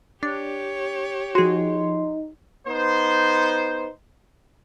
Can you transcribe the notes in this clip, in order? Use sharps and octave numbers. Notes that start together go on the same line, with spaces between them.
D4 G4 C#5
F3 D#4 F#4 G#4 C6
B3 D#4 C5